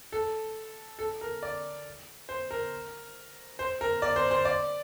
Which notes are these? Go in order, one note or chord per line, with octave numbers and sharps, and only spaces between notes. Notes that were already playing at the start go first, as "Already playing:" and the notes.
A4
A4
A#4
D5
C5
A#4
C5
A#4
D5
C5
C5
D5